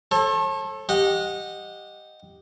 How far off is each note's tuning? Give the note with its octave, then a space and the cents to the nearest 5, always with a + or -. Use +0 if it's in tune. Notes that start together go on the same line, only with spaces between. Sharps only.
A4 +0 C#5 -45
G4 +0 D#5 -5 F#5 -25